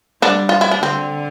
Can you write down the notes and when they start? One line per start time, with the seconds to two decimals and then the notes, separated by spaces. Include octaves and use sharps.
0.22 D3 G3 D4
0.49 F4
0.61 E4
0.71 D4
0.83 D3 C4